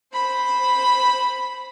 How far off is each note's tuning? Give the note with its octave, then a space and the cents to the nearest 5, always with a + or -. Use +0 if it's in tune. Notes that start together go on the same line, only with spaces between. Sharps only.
C5 +0 B5 +0